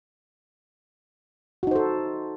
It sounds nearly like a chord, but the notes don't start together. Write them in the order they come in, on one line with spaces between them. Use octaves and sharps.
F#4 D#4 C5 A4